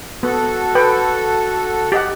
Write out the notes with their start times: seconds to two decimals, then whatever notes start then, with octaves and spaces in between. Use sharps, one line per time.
0.23 B3 F#4 A4
0.75 B4 G5
1.92 G4 D#5 F#5